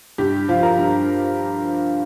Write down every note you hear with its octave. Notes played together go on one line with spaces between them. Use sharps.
G2 G4
F3 F4
A#4
G2